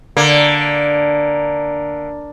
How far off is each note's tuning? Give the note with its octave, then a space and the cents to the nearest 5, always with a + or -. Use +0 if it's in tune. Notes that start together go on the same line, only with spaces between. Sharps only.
D3 +0 A#3 +0